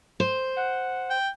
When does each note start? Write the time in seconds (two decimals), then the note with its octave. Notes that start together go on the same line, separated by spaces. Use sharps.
0.20 C5
0.57 F#5
1.10 G5